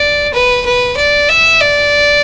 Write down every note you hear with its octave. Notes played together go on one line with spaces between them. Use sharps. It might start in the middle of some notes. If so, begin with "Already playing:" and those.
Already playing: D5
B4
B4
D5
E5
D5